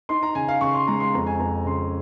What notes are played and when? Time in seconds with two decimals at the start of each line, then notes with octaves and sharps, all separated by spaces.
0.09 D#4 C6
0.23 A#5
0.35 C#3 G#5
0.48 F5
0.61 C#3 C#6
0.75 C6
0.87 G#3 A#5
1.00 C6
1.14 F2 A#5
1.27 G#5
1.40 F2 A#5
1.66 C#3 C6